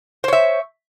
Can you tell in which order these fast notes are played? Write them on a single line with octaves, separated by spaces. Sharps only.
C5 C#5 E5